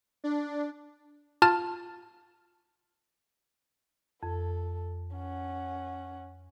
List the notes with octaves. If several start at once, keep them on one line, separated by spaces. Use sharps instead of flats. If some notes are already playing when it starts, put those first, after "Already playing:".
D4
F4 A5 F6 A6
F2 A4
C#4 F#5